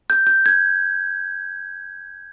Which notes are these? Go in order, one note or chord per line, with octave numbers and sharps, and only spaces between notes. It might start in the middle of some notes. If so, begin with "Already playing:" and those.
G6
G6
G#6